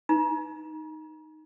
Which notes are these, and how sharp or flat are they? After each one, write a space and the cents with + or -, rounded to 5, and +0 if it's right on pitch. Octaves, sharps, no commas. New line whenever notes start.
D#4 +0 A#5 +40